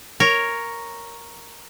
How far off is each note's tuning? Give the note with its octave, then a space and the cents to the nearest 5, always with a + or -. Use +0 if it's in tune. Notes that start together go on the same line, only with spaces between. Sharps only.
A#4 +0 C#5 +0